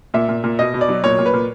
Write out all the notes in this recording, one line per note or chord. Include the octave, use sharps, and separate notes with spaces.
A#2 E5
A#2
A#2
B2 D#5
B2
D5
F#3
A#2 C#5
A#2
B4
A#2